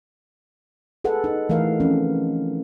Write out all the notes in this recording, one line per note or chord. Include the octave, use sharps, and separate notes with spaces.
G#4 A4 B4 F#5
D#4
E3 A3 A#4 F5
F3 C4 C#4